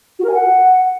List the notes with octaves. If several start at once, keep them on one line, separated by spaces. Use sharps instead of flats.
F#4
A#4
G#5
F#5